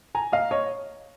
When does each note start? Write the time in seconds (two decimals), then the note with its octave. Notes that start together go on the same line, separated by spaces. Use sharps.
0.15 G#5 A#5
0.32 D#5 F5
0.51 C#5 D#5